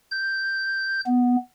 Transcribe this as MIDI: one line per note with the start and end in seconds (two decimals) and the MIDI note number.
0.12 1.01 91
1.07 1.36 59